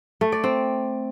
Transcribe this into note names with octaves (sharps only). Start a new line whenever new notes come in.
A3
D5
C4